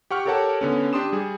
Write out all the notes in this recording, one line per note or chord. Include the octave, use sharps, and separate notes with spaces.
G4 F#5 C#6 F6
G4 A4 A#4 C#5 F#5 A5
D3 B3 C#4
D4 G4 C6 D#6 E7
G3 G#4